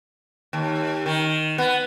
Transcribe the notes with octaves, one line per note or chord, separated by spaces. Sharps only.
D#2
D#3
B3